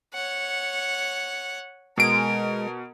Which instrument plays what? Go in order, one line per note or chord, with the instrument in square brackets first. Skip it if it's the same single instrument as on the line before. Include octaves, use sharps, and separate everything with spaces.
[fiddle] C#5 F#5
[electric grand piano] B2 D7 [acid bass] G#3 [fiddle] A#4